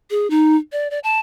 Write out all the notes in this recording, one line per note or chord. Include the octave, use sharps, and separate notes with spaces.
G#4
D#4
D5
D5
A5